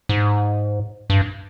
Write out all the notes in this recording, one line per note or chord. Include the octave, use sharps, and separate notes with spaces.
G#2
G2